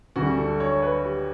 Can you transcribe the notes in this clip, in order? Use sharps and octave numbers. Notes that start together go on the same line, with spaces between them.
D2 D3 G3 F#4
A4
C#5
B4
G4